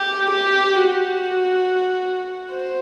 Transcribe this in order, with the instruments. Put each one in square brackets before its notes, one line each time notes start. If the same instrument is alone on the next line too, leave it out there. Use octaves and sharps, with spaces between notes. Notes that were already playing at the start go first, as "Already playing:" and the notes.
Already playing: [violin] G4
G4
F#4
C5